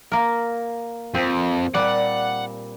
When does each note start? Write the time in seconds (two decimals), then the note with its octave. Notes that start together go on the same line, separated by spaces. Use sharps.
0.12 A#3 A#4
1.14 F2 C4
1.74 A#2 G3 D5 F#5